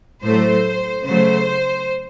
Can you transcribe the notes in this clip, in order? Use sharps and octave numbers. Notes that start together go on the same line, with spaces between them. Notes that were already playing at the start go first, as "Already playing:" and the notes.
A2 F#3 A3 C5
C#3 F#3 A3 C5